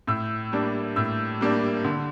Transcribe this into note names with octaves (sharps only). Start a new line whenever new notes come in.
A2 E6
G3 A#3 D4
A2 E6
G3 A#3 D4
D3